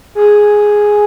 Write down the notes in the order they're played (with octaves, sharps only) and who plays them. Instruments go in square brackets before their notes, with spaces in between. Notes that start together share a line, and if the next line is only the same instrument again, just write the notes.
[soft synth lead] G#4